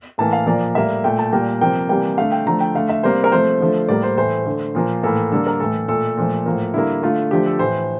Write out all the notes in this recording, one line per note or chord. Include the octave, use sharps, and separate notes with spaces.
A2 E3 A#3 A5
F5
A#2 F3 A#3 D5
A2 G3 A#3 E5
A#2 A3 G5
A5
A#2 G3 A#3 G5
C3 F3 A#3 G5
C3 E3 G3 A#3 G5
D3 A3 F5
G5
D3 F3 A3 A#5
G5
D3 A3 F5
E5
C3 G3 A#3 C5
A#4
C3 F3 A3 C5
D3 F3 A3
A2 G3 A#3 D5
C5
A2 E3 A3 C5
D3 A3
A#2 F3 A#3
A2 E3 A#3 A4
D3 G3 A#3 A4
A#4
A2 E3 A3 A4
A#2 A3 A4
A#2 F3 A3
A2 F3 A#3
D3 G3 A#3 E4
D3 A3 F4
D3 F3 A3 G4
A4
A2 E3 A3 C5